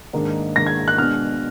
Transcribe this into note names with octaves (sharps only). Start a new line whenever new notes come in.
G#2 D#3 A#3 D4
G#2 D#3 A#3 D4 A#6
G#6
F#6
B2 G#3 D4 F6